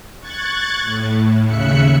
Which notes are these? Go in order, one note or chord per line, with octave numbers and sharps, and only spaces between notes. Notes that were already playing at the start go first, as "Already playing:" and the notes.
C#6 F#6 G#6 A6
A2
D#2 C#3 E5 F#6 C#7